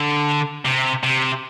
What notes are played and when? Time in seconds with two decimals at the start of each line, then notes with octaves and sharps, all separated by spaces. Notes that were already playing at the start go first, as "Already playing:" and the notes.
Already playing: D3
0.65 C3
1.03 C3